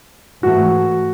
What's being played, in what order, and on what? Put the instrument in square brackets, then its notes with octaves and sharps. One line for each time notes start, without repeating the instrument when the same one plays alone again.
[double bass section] G#2 E3 A3 [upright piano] F#4